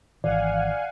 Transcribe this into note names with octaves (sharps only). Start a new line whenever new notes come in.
G#1 E3 D5 F5 F#5 G#5